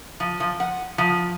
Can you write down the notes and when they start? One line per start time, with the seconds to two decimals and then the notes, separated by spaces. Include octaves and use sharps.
0.20 F3
0.40 F3
0.60 F#5
0.98 F3